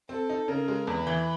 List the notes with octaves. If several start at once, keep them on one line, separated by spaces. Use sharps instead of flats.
C4 A4
D#4
C#3 A#4
G#3
E2 B4
E3